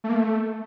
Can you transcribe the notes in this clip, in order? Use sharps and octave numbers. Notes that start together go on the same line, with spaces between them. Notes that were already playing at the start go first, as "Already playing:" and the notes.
A3
A#3
A3